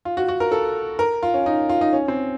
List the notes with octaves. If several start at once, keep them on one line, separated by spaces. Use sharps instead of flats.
F4
F#4
F#4
A#4
A4
A#4
F4
C#4
D#4
F4
D#4
C#4
C4